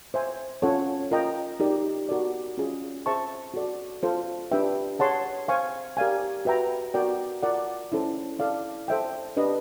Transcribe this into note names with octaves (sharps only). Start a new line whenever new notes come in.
C5 E5 G#5
C#4 F4 A4 C#5 F#5
F4 A#4 D#5 G5 A#5
D#4 G4 A#4 D5
F#4 A#4 D5
C#4 F4 G#4
G#4 C5 E5 A5 C#6
F#4 A4 D5
F4 A4 C5 F5
D4 G4 B4 E5 G5
G#4 C#5 F#5 A5 C6
C5 F5 G#5 C#6
G4 A#4 D5 F5 G#5
F#4 B4 E5 G5 A#5
F#4 A#4 D5 G5
F4 A#4 D5 F#5
C#4 E4 A4 C5
E4 A4 D5 F5
A4 C5 E5 G5
D4 G4 B4 D#5